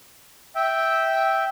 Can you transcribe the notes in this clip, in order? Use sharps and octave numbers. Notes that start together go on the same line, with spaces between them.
E5 G5